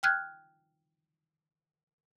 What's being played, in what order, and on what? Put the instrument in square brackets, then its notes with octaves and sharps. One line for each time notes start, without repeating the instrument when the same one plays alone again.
[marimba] G5 F6 F#6 G#6